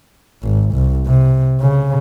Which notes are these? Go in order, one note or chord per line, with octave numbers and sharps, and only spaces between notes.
G#1
C2
C3
C#3